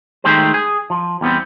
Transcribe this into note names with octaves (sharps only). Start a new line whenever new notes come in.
D#3 G#3 A3 G4 G#4 C5
G#4
F3
E2 G3 B3 C4